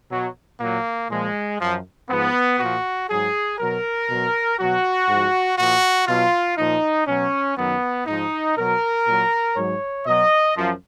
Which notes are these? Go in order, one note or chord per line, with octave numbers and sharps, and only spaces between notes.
B2 F#3
A#2 F#3 A#3
A#2 F3 G#3
F#2 F3
G#2 F3 B3
A#2 F3 F#4
G#2 F#3 G#4
B2 F#3 A#4
B2 F#3
B2 F#3 F#4
G#2 F3
A#2 F3 F#4
B2 F#3 F4
A#2 F3 D#4
B2 F#3 C#4
F#2 D#3 F#3 B3
G#2 F3 D#4
B2 F#3 A#4
A#2 F#3
G#2 F#3 C#5
B2 F#3 D#5
F#2 F3